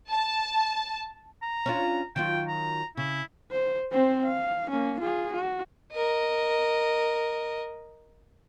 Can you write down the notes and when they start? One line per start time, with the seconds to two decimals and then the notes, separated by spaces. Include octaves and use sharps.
0.10 A5
1.43 A#5
1.66 C#4 D4 F4
2.16 D#3 F#3 F4 G5
2.48 A#5
2.97 C#3 E4
3.51 C5
3.92 C4 C5
4.25 F5
4.70 A#3 C#4
5.00 F4 G#4
5.32 F#4
5.92 A#4 D#5